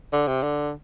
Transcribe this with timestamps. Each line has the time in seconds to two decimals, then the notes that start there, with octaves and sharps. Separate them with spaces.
0.13 D3
0.28 C3
0.43 D3